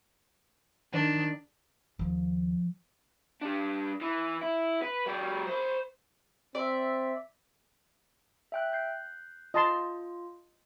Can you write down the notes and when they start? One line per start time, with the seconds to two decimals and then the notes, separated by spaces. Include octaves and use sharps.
0.93 D#3 D4
1.99 D#2 F3
3.42 G3 D4
4.02 E3
4.41 E4
4.82 B4
5.06 F#3 G4
5.47 C5 B5
6.55 C4 D5 E5
8.52 E5 G5 F#6
8.72 F#6 G6 C7
9.54 F4 D#5 A5 C6